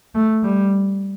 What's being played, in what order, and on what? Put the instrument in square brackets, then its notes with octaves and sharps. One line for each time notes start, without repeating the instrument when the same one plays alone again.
[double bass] A3
G3